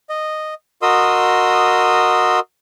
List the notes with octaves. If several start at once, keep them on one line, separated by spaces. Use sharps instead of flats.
D#5
F#4 A#4 D#5 C6 D#6 E6